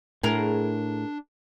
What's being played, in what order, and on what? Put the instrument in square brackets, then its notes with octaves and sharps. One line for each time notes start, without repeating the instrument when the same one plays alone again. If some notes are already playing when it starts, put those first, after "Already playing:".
[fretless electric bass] A2 [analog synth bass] D4 [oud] G#4 A#4